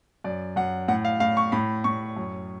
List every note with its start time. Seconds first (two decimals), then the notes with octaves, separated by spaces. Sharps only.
0.24 F#2 D5
0.56 F#2 F#5
0.88 A2 F#5
1.05 F5
1.20 A2 F5
1.37 C#6
1.52 A2 B5
1.84 A2 C#6
2.17 F#2